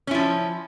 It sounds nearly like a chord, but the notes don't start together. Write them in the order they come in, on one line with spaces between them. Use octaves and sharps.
C#4 E4 F3